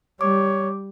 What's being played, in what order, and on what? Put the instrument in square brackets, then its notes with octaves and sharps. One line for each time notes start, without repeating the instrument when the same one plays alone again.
[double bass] G3 [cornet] C#5 [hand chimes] D6